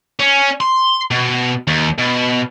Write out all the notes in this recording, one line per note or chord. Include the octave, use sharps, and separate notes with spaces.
C#4
C6
B2
D#2
B2